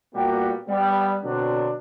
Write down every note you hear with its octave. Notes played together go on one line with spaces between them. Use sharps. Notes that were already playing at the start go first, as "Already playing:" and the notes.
A#2 G3 A#3 B3 F#4 G4
G3 B3
B2 D3 F#3 C4 D4